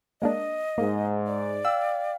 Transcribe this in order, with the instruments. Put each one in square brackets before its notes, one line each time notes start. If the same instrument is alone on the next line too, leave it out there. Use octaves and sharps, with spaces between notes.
[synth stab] G#3 A#3 D4 [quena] D#5
[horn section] G#2 [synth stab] A#3
[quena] D5
[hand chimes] F5 G5 [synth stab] E6